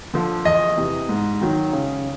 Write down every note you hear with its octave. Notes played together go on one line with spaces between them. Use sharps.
D3 F3
E2 D#5
C3 E3
G#2
D#3 F#3
C#3